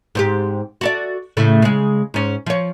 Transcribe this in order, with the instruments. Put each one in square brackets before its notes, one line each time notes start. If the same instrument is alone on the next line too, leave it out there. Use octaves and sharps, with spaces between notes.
[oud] G#2 C4 G4
F#4 A4 D5
A2 C#3 A3
C#3 G#3
G#2 C#4
F3 C#5